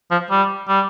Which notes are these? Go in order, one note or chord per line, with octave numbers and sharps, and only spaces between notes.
F3
G3
G3